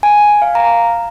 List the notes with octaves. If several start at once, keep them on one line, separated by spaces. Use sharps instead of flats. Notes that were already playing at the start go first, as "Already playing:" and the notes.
G#5
F5
A#5